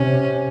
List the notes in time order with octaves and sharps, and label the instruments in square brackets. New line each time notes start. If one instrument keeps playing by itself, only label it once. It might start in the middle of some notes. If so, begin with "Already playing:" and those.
Already playing: [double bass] C3 [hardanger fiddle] C#4